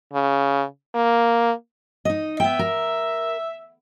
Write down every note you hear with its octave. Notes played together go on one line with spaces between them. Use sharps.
C#3
A#3
D#4 D#5
B3 E5 G5
A#4